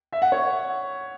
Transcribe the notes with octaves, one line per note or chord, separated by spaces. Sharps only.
E5
F#5
C#5